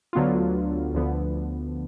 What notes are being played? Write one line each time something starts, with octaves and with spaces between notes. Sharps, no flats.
D2 D3 F#3 B3 F4
D2 D3 F3 B3